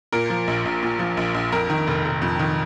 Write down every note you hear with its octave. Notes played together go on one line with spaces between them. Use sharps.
A#2 A#4
F3
A#1
A#1
A#2
F3
A#1
A#1
F2 A#4
D#3
F1
F1
F2
D#3